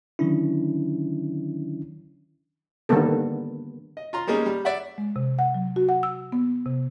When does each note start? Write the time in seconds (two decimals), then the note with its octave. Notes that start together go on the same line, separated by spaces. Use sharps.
0.19 D3 D#3 F#3 C#4 D4 E4
2.89 D3 D#3 G3 A#3 B3 A4
3.97 D#5
4.13 F4 A#5 C6
4.27 G3 G#3 A#3 C#4 D#4 G#4
4.46 G3
4.65 D5 E5 F#5
4.98 G#3
5.16 C3
5.39 F#5
5.54 F#3
5.76 F#4
5.89 F#5
6.03 E6
6.32 B3
6.66 C3